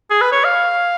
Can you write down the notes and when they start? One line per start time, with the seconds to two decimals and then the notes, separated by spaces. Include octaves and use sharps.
0.10 G#4
0.21 B4
0.32 C#5
0.45 F5